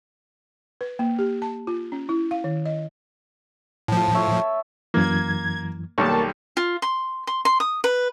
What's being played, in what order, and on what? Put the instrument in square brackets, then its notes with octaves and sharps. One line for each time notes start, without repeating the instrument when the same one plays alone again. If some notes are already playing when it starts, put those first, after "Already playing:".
[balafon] B4
A#3
G4
A5
F4
C#4
E4
F5
D#3
D#5
[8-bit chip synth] A2 F3 [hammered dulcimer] A5
[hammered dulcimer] C#5 E5
[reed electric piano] F#2 E3 [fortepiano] A#3 [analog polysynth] G#6
[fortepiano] B1 D#3 G3 [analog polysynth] A#3 A5 [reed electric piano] C#6 D6
[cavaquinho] F4
C6
C6
C6
D#6
B4